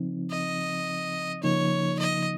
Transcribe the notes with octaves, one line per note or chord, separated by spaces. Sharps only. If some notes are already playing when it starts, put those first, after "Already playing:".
Already playing: C#3 F3 C4 D#4
D#5
C#3 F3 A#3 D#4 C#5
D#5